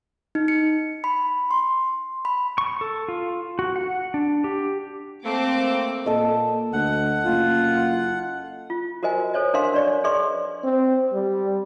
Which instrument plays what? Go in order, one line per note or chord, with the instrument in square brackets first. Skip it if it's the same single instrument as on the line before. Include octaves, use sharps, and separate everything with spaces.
[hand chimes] D#4
C#7
B5
C6
B5
[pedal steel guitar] C#6
A4
F4
F#4
F#5
D4
G4
[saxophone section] A3 A#3 [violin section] C4 D6
[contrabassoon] A#2 [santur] A4 D#5
[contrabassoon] D2 [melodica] F#5
[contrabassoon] F#1 [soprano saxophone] F4
[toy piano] F4
F#4 A#4 C5 D#5 G#5
A4 C5 C#5 D#5
D4 A#4 C5 D#5 F5 C6
D4 C#5 D5 C#6
G#4 B4 D5 D#5 C6 C#6
[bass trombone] C4
G3